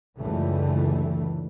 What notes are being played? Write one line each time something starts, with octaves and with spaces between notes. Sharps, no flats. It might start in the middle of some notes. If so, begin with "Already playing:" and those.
C#2 F#2 D3 E3 G3 A3